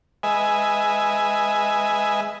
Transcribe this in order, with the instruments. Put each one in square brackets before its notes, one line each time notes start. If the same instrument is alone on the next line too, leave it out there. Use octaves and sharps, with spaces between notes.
[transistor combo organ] G#3 B4 D#5 E5 G#5